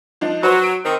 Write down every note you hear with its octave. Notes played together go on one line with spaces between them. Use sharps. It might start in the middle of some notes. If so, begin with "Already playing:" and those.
F3 D4 D#4
F#3 B4 C5
D7
D#3 C4